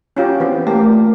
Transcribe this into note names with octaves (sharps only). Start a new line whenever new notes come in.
F#3 C#4 F4 G4
E3 B3 C4
A3 A#3 G4
A#2